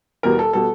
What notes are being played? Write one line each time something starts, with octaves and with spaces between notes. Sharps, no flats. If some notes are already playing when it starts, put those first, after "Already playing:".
E2 B2 G3 A#4
A4
B2 G3 A4